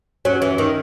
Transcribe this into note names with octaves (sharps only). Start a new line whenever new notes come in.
F#3 C#4
E3
D#3